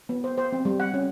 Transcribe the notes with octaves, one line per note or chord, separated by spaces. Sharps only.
B3
C5
C5
C4
G3
F#5
C#4